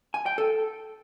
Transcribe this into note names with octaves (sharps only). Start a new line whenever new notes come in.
G#5
G5
A4